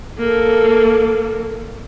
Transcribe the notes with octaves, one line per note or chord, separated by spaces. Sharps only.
A#3 A4